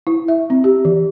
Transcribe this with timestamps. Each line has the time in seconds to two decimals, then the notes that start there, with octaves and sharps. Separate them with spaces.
0.07 E4
0.28 E5
0.50 C4
0.64 G4
0.85 E3